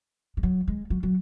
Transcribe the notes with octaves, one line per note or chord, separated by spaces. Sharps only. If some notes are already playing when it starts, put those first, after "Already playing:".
G#3
F#3
G#3
F#3
F#3